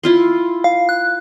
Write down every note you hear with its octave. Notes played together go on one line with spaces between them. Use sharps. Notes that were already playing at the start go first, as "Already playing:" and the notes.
E4 F4 C6
F5
F#6